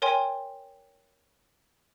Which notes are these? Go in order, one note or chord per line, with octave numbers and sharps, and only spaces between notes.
A#4 C#5 G5 G#5 C6